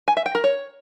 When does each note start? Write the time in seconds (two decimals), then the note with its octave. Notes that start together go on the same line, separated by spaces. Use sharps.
0.08 G#5
0.17 E5
0.26 G5
0.35 A#4
0.44 C#5